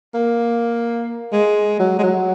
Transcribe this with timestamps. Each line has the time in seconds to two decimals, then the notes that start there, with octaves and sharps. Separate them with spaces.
0.14 A#3
1.32 G#3
1.80 F#3
1.99 G#3
2.03 F#3